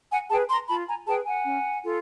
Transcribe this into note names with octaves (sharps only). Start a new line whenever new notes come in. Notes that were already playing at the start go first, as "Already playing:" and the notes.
F#5 G#5
G#4 B4 G5 A5
A#5 C6
F4 A5 B5
G#5 A#5
G#4 B4 G5 A5
F#5 G#5
C#4
F4 A4